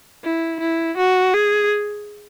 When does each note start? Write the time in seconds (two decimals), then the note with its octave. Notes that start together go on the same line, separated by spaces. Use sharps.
0.24 E4
0.61 E4
0.98 F#4
1.34 G#4